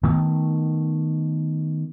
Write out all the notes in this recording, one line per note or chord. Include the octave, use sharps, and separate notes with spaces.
D#3 A3 B3